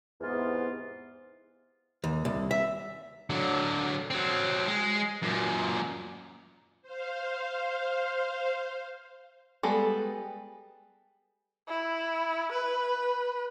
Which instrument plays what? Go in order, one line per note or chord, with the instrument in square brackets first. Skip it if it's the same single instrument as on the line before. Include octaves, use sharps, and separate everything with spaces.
[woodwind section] E2 G#2 C3 E3 B3 F4
[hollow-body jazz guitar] D#2
C2
E5
[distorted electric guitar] D3 F#3
F#3 C4
G#3
F#2 A#2
[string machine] C5 F5
[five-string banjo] G3 G#3 B3 A4
[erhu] E4
B4